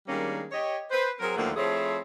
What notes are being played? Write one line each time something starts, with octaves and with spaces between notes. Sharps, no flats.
D#3 G3 G#3 A#3 C#4 D4
G4 C#5 D#5
B4 C5
F#3 C4 G#4 A#4
D#2 D3 F3 F#3 A3 A#3
F3 A3 C4 E4 G#4 C#5